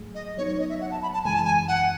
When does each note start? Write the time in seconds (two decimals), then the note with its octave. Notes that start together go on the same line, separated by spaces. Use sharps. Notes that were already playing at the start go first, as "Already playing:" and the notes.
Already playing: G#2 F#3 A3 G#4
0.15 D#5
0.37 F#3 B3 D#4 C#5
0.48 C#5
0.59 D#5
0.69 E5
0.81 F#5
0.91 A5
1.02 B5
1.14 A5
1.25 F#2 C#3 E3 G#3 G#5
1.35 A5
1.45 G#5
1.68 F#5